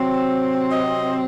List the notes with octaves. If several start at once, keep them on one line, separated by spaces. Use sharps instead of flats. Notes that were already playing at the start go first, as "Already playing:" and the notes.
Already playing: C3 F#3 C4
D#5